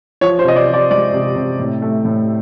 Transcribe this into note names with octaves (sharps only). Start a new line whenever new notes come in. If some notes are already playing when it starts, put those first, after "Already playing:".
F3 C#5
C5
C3 D#5
D5
F3
D5
G#3 D5
C3
C3
A2
A3
A2